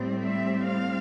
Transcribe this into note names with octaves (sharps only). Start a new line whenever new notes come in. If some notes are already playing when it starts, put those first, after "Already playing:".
Already playing: A2 G3 C4
E5
F5